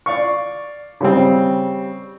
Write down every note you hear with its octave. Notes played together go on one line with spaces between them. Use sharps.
D5 F5 C#6
C#3 G3 C4